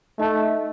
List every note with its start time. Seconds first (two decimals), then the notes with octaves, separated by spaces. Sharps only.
0.19 A3 D#4 A4 D#5 A5